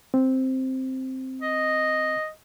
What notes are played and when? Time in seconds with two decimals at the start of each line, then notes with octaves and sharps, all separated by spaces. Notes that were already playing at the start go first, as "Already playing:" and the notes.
0.14 C4
1.42 D#5